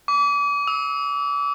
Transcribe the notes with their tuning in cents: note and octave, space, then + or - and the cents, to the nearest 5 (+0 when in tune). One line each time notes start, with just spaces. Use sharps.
D6 -35
E6 -40